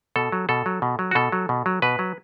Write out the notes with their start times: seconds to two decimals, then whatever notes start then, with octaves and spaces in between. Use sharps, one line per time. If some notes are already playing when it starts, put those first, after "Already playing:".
0.16 B2 A4
0.32 F#3
0.49 B2 A4
0.66 F#3
0.82 B2
0.99 F#3
1.11 F#4
1.15 B2 A4
1.32 F#3
1.49 B2
1.66 F#3
1.82 B2 B4
1.99 F#3